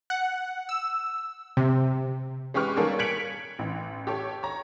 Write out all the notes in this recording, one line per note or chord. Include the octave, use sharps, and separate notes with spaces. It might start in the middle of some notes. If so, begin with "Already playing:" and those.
F#5
E6
C3
G#3 C#4 G4 B4 C#6 F6
D#3 G3 A#3 G#4 A4 C#5
G#6 B6 C#7 D7 F7 F#7
A1
G4 A4 C#5
C#5 A#5